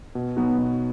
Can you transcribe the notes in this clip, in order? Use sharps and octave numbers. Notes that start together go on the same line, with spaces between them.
B2
F#3 B3 D#4 F#4
B2